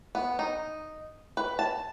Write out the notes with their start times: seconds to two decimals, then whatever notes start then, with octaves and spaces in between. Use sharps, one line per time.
0.15 B3
0.39 D#4
1.37 B4
1.59 A5